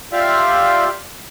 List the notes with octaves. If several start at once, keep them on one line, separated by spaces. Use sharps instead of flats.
F4 G4 D5 E5 F5